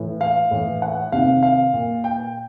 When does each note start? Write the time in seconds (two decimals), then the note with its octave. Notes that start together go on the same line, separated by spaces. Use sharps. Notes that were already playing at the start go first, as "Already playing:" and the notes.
Already playing: A2 E3
0.21 F5
0.51 A2 E3
0.82 F#5
1.12 C3 D#3 F5
1.43 F5
1.73 A#2
2.04 G5